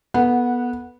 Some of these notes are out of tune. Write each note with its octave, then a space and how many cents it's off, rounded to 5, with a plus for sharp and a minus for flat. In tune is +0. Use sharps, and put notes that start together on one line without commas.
B3 -15 A4 +0 F#5 +0